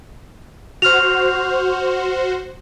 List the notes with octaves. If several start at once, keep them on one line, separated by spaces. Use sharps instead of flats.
F#4 C5 F6 F7